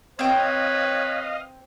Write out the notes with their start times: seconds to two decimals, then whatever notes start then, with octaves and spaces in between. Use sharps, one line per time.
0.19 C4 B4 C#5 D#5 F5 G5